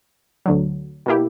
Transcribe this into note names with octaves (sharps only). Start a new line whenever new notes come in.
D2 D3 F#3
B2 A#3 E4 G4